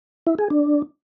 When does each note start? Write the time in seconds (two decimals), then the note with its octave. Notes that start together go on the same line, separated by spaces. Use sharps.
0.27 E4
0.38 G#4
0.50 D4